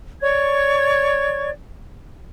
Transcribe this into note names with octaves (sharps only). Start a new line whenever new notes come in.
C#5 D5 C#6 G#6